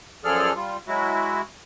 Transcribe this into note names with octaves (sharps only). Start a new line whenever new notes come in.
F#2 F3 G#4 A4 D5 F6
G3 F4
F#3 G#3 E4 F#4